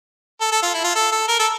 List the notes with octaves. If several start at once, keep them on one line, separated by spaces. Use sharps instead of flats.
A4
A4
F4
E4
F4
A4
A4
A#4
A4